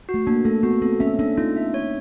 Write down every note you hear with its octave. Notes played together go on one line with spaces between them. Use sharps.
F#4
A3
A#3 D4
A3 A4
B3 F#4
C4 A4
C#4 E5
D4 A4
D#4 F4
E5
C#5